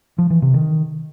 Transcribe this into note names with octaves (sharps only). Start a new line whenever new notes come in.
F3
E3
C3
D#3